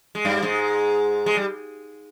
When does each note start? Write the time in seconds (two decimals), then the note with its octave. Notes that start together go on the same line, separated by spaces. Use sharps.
0.15 G#3
0.25 G2 G3
0.43 G#2 G#3
1.26 G#3
1.37 G3